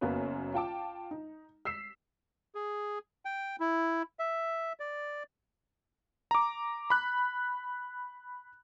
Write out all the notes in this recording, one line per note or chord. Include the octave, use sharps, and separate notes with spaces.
F#1 F#2 A#3 B3 C#4 B4
F4 G5 A5 D6
D#4
E6 B6 C7 E7
G#4
G5
E4
E5
D5
A#5 D6
B5 F#6